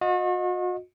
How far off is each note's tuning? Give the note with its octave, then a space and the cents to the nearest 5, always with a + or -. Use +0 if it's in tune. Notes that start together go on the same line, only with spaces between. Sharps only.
F#4 -40 D#5 +0